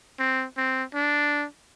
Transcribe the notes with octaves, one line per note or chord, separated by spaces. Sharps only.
C4
C4
D4